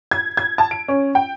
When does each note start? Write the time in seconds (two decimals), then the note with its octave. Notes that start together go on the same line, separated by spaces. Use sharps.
0.11 G#6
0.37 G#6
0.58 A5
0.71 D7
0.88 C#4
1.15 G5